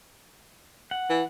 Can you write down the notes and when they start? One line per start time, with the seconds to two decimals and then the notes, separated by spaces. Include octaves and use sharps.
0.91 F#5
1.10 E3